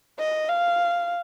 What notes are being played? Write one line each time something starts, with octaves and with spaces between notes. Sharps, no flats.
D#5
F5